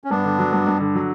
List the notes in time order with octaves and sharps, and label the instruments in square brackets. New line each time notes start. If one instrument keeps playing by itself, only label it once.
[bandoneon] C#4
[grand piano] G2 [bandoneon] B3 D4
[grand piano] D3
F#3
G2
G2
D3
F#3